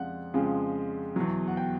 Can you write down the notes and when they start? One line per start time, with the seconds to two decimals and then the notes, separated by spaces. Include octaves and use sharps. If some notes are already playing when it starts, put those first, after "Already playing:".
Already playing: F2 C#3 F3 G#3 D5 F5 F#5
0.34 F2 C#3 F3 G#3
1.16 E2 B2 F#3
1.48 F#5
1.57 G5